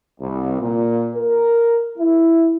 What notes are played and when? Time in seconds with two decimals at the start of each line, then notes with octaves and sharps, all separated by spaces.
0.20 C2
0.60 A#2
1.15 A#4
1.98 E4